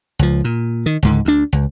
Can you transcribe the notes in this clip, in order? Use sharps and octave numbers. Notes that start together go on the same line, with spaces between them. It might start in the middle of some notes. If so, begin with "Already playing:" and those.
C#2 F3
A#2
D#3
C#2 G#2 D3
D2 D4
C#2